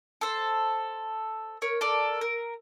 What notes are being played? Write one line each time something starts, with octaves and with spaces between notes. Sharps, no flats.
A4 C5
A#4 C#5
A4 A#4 D5
A#4